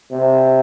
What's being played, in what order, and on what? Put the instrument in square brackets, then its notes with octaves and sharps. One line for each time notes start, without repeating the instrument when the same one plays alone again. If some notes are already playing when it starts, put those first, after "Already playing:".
[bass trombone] C3